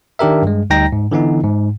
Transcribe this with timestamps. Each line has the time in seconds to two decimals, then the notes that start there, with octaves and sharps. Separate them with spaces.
0.19 D#3 D4 G4 A#4 E5
0.42 G2 G#3
0.70 D2 G3 D#4 G5 A#5 A#6
0.92 G#2
1.11 D3 E3 B3 D#4
1.44 G#2